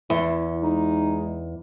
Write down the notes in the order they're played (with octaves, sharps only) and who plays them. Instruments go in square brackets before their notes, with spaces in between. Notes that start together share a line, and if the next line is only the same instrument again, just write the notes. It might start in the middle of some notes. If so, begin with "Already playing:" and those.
[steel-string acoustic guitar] E2 [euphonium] E4
[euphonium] G#3 [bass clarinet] D#4